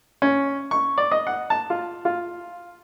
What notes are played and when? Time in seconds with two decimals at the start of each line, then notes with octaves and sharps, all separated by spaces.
0.22 C#4
0.71 C#6
0.98 D5
1.12 D#5
1.27 F#5
1.50 A5
1.70 F4
2.05 F4